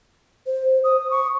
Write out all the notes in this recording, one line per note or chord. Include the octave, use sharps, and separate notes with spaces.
C5
D#6
C#6